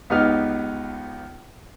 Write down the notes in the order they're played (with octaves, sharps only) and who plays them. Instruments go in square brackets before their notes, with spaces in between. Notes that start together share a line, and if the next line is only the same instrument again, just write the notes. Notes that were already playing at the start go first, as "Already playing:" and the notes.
[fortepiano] C#2 B3 D#4 G4 F6